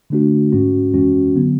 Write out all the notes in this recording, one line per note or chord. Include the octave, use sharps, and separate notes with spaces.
D3 A3 D4 F#4
G#2 G#3 C#4 F#4
F#2 E3 G#3 C#4 F#4
D3 F#3 B3